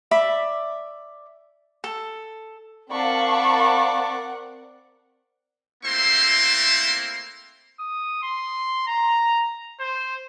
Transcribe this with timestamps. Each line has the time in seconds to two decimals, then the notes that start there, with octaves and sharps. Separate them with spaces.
0.11 D5 E5 B5
1.84 A4
2.92 C4 A#4 D5 F5 F#5 A5 B5 C#6
5.84 A3 A#3 C4 E4 C5 C6
7.80 D#6
8.23 C6
8.87 A#5
9.80 C5